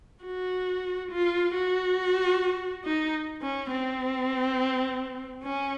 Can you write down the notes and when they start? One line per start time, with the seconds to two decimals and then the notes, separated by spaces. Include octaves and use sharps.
0.24 F#4
1.11 F4
1.54 F#4
2.84 D#4
3.42 C#4
3.71 C4
5.44 C#4